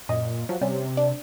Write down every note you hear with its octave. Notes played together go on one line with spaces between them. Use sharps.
F#2 A#2 D#5
F3 F#3
C3 G3 C#4
D4